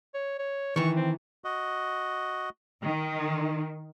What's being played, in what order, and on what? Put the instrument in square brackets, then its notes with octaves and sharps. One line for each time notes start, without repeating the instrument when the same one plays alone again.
[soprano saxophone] C#5
C#5
[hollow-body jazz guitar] D#3 E3 [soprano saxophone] C#6
[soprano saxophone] C4
[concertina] F#4 D#5
[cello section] D#3